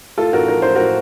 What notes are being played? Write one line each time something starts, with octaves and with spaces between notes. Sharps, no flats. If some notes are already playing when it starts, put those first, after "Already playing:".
A2 F4 A4
A1 F#4 A#4
F3 A#4
A1 C5
A2 F#4 A#4